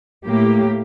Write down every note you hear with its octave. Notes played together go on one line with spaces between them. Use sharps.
A2 A#3 G4